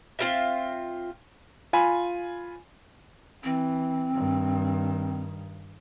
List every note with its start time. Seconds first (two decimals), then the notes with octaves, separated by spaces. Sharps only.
0.19 C4 F4 E5
1.73 F4 G#5 B5
3.44 E3 C4
4.14 G2 D#3